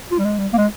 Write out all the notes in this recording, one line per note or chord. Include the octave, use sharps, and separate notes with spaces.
F4
G3
G#3
G3
A#3
G#3